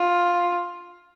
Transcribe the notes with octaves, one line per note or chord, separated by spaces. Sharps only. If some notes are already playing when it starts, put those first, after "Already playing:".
Already playing: F4